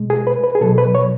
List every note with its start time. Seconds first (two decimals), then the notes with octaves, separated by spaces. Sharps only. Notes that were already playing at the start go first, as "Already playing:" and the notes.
Already playing: B2 G#3
0.10 G#4
0.27 B4
0.44 B4
0.55 G#4
0.61 B2 F#3 A4
0.78 B4
0.95 C#5